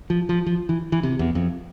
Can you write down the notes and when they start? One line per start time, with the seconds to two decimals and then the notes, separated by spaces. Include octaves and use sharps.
0.10 F3
0.29 F3
0.46 F3
0.69 E3
0.92 E3
1.03 C3
1.19 E2
1.35 F2